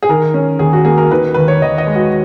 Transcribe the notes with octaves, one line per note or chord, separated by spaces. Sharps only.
G#4
D#3 A#4
C#4
D#2 G#4
F#4
A#3 G#4
A#4
D#3 B4
D#2 B4
C#5
D#2 D#5
D#5
G#3
F#4